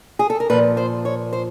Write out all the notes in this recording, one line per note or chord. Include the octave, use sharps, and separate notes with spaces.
G#4
A4
A#4
A#2 F3 B4
C5
C#5
C5